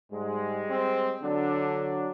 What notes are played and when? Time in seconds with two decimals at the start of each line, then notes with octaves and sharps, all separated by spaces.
0.12 G#2 G3 G#3
0.70 C4
1.23 D3 F#3 D4